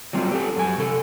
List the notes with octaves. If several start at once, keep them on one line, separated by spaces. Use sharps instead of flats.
F#3 G3 C4 F4
G4 A4
F#2 G#5
C3 A4